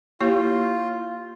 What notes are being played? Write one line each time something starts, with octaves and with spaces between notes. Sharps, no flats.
A#3 E4 F4 G4 C#5